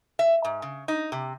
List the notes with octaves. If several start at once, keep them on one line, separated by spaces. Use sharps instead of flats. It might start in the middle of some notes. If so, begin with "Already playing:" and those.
E5
G#2
C#3
D#4
C3